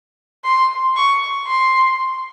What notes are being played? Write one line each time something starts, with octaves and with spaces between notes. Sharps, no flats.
C6
C#6
C6